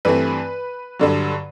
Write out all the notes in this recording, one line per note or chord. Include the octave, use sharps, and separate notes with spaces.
G2 E3 A3 C4 B4
G2 D3 F#3